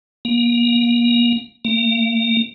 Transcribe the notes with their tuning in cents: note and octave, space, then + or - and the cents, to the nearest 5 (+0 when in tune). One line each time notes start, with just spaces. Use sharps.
A#3 +35
A#3 -30